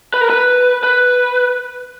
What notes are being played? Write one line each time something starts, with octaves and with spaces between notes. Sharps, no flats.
B4
A#4
B4
B4